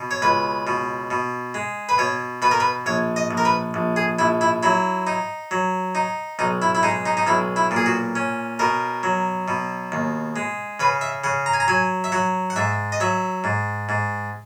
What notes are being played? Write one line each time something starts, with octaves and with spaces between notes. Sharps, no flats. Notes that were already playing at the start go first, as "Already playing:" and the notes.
Already playing: B2
C#5
C#2 B4
B2
B2
G#3
B4
B2 C#5
B2 B4
A#4
B4
A#1 C#5
D#5
A#1
A#4
B4
A#1
G#4
A#1 E4
E4
F#3 E4
D#4
F#3
D#4
B1 D#4
E4
E4
G#3 D#4
D#4
D#4
B1 E4
E4
A#2
G#4
F#4
C#4
B2 A#4
F#3
B2
D#2
G#3
C#3 B4
E5
C#3 F#5
A#5
G#5
A#5
F#3 G#5
E5
F#3 F#5
F#5
G#2 E5
D#5
F#3 E5
G#2
G#2